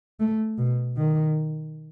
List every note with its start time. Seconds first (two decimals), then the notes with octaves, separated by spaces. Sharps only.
0.20 A3
0.58 B2
0.97 D#3